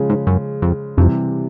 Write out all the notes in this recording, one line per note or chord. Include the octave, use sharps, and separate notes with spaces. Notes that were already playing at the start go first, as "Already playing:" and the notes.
Already playing: C#3 F3 G#3
G#2
F#2
F2
F2 C3 E3 G3